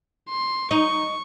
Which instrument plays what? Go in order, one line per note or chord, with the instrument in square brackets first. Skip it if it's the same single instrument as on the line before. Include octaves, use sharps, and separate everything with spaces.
[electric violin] C6
[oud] D#4 [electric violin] C#6